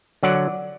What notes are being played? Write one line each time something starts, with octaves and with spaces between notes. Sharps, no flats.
D3 F#3 D5 F#5